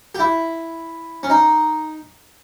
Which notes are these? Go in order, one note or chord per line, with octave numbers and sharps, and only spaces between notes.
G4
E4
C#4
D#4